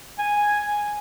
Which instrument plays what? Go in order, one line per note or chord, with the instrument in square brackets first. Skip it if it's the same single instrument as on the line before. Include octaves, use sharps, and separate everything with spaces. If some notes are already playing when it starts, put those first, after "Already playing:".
[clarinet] G#5